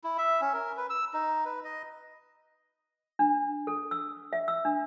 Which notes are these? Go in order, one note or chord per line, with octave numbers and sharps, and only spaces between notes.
E4
E5
C#4
A#4
B4
E6
D#4
B4
D#5
D4
A4
E6
E5
E6
D4